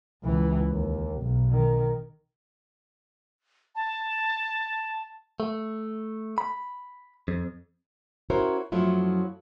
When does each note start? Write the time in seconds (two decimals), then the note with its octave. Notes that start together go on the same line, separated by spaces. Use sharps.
0.24 C#2 E3
0.70 D#2
1.21 B1
1.51 D#3
3.75 A5
5.40 A3
6.38 B5
7.28 F2
8.30 C#4 E4 F#4 A#4 C5 C#5
8.72 F#2 F3 F#3 A3 E4 F4